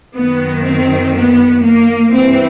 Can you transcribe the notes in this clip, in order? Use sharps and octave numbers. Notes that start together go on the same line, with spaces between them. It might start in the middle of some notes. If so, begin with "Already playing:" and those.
F#2 D#3 B3
C4
B3
A#3
G2 E3 C4